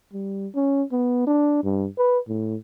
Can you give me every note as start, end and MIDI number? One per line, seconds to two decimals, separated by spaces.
0.13 0.47 55
0.55 0.83 61
0.92 1.24 59
1.27 1.59 62
1.64 1.86 43
1.98 2.19 71
2.28 2.56 45